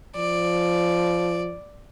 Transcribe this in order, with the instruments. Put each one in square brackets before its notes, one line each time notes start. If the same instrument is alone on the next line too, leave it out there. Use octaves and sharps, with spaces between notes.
[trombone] F3 [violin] D5